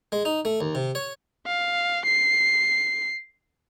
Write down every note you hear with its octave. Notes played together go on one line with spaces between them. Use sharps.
G#3
D#4
A3
D#2
C3
C#5
F5
C7